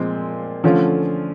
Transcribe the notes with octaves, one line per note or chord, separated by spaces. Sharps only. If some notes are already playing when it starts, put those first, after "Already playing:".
Already playing: A#2 F3 G#3 C4
D3 F3 A3 C#4 F4